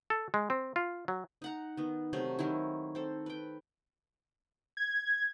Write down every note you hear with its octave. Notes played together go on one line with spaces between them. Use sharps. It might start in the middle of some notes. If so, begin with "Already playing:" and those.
A4
G#3
C4
F4
F#3
D#4 F#5 A#5
D#3 B3
C3 D#3 F#3 A3
D#3 F#3 C4 E4
C4 A4
B4 G5
G#6